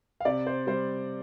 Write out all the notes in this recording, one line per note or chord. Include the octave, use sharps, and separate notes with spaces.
F5
C3 D5
C5
G3 C5